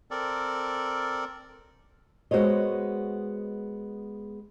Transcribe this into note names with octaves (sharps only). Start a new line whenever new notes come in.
C4 A4 A#4 D5
G#3 B3 F#4 C5 C#5 D#5